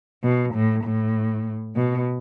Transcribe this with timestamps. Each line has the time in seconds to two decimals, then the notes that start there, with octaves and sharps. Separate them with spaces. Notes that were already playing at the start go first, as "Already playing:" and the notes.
0.24 B2
0.54 A2
0.84 A2
1.76 B2